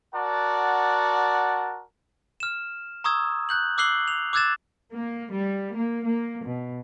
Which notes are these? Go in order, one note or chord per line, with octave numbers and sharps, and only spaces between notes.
F#4 A#4 D5 F#5 A5
F6 E7
A#5 C#6 D#6 E6 G#6
F#6 G6 F#7
D6 E6 F#6 C7 F#7 G7
F7
D6 E6 F#6 G#6 A6 E7
A#3
G3
A#3
A#3
B2